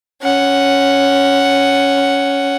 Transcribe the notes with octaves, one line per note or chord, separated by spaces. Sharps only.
C#4 F#5